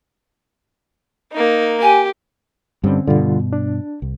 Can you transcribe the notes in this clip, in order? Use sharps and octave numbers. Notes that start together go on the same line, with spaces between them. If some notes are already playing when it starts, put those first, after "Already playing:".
A#3 D#4
G4 G#5
G2 D3 G3 C4 C#4
G2 B2 D3 G3 F4
D4
C2